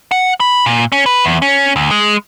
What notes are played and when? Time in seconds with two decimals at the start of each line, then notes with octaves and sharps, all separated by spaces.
0.11 F#5
0.40 B5
0.66 A#2
0.92 C#4
1.06 B4
1.25 E2
1.42 C#4
1.76 D2
1.91 G#3